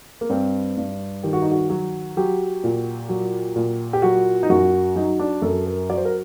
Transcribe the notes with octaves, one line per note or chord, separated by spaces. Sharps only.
A#3
G2 C4
G2
D#3 G4
F#4
D#4
F#4
F#3 F#4
F#3 G4
A#2
F#3
A#2
G4
F#3 F#4
D#4
F#2 F#4
F#3 D#4
D4
F#2 A4
A#4
F#3 D5
C5
A#4